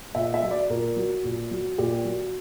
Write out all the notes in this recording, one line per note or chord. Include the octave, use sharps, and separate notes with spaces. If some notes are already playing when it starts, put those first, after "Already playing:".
A#2 E5
E5
F#3
D5
A#2 A#4
F#3
A#2
F#3
A#2 G4
F#3